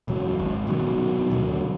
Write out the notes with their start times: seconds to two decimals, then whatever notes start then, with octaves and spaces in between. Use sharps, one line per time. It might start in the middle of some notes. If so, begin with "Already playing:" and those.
0.08 E1 C#2 F#3
0.39 G#1
0.67 F1 B2 D#3 F#3
1.31 D2 B2 D3 F#3